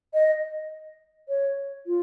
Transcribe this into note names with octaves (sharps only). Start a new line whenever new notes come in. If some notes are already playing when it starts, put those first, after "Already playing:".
D#5
C#5
F4